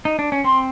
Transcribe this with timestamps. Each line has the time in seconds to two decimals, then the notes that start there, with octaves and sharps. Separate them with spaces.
0.05 D#4
0.19 D4
0.32 C#4
0.44 C4 C6